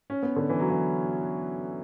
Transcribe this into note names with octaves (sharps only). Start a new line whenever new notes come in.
C#4
B3
D3
E3
F#3
E3